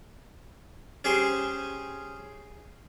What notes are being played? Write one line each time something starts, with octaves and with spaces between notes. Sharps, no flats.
C#4 G4 G#4 C5